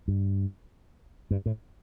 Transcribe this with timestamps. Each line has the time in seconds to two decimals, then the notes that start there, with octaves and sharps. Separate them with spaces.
0.08 G2
1.31 G2
1.46 A2